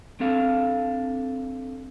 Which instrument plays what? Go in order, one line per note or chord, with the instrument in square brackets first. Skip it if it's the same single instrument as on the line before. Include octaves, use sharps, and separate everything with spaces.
[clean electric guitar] C4 D4 A4 F5